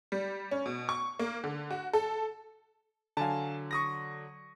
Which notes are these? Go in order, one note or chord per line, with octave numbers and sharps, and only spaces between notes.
G3
C#4
B2
C#6
A#3
D3
F#4
A4
D3 F#3 F5 G#5 A5
C#6 D#6 A#6